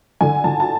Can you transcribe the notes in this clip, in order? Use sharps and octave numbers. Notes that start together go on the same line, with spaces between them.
D3 G#5
D3 A5
A5